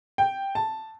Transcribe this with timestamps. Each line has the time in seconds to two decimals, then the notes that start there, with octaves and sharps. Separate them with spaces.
0.18 G5
0.55 A5